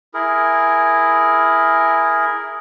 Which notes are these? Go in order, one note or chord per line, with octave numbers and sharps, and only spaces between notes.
E4 G#4 A#4